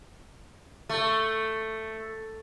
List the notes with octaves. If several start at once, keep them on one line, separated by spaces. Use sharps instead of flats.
A3